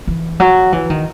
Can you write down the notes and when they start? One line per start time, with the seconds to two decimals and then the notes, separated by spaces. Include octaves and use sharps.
0.07 E3
0.40 F#3
0.73 E3
0.90 D#3